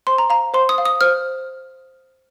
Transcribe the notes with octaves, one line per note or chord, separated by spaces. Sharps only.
C5 C6
A#5
F5 A#5
C5 C6
D#6
F5
D#6
C5 F6